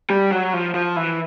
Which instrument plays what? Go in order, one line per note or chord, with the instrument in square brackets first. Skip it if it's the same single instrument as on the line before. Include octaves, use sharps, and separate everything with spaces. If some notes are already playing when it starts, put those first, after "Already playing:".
[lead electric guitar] G3
F#3
F3
F3
E3